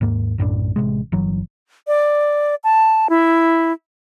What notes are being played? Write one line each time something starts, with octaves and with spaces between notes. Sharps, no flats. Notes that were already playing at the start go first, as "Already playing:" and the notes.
D#2 G#2 A#3
B1 F#2 A2 D4
A1 C3 G#3
G1 E3 F#3
D5
A5
E4